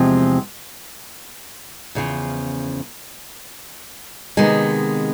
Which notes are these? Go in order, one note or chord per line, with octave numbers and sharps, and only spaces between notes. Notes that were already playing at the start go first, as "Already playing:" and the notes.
Already playing: E2 C3 F3 G#3 C4
E2 C#3 F3
C3 D#3 G#3 B3